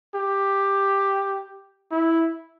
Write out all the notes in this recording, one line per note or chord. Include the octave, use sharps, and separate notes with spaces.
G4
E4